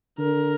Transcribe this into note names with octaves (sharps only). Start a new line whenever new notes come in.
D3 A#4